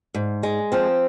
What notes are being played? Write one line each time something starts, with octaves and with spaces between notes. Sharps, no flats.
G#2
G#3
F3 C4